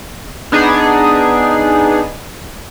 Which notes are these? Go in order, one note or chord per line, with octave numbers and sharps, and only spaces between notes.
B3 D4 D#4 G#4